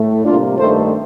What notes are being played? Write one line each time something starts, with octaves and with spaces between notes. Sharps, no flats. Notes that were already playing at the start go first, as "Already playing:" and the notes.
Already playing: A2 A3
C3 G3 A#3 D4 F4
G2 D#3 A3 A4 C5